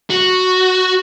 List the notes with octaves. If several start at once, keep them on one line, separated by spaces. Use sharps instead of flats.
F#4